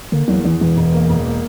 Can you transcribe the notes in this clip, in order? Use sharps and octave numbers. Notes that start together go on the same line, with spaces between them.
D3 A#3
E2 F#3
E2 E3
E1 E3
E1
A#3
E1
A#3